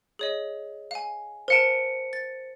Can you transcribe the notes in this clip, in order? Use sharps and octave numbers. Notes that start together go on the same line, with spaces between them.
G#4 C#5 D#5
F5 G#5
A#4 C5 F5 A5 C#7 D7
A6